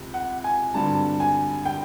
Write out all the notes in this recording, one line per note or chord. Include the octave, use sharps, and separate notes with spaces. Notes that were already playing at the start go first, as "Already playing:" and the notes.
Already playing: C#2 C3
F#5
G#5
G#1 G2 D3 G3 A5
G#5
G5